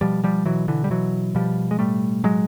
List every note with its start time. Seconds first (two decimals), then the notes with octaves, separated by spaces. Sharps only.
0.01 B2 F3 G3
0.24 F3 G3
0.45 B2 E3 F#3
0.68 D3 E3
0.84 G3
0.90 B2 E3 F#3
1.35 B2 F3 G3
1.71 G#3
1.79 A2 G3 A3
2.24 A2 F#3 G#3